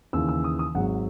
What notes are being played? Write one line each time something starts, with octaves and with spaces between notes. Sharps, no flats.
D#2 C#3 E3 E6
E6
D#6
D#6
G#1 G#2 F#3 F#5